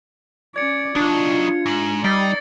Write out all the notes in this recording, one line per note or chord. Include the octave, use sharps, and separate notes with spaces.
C#4 D5 G#6 C#7
F#3 D4 D#4 F4
G#2 A#6 F#7
G3 D#4 D5 E6 A6 C7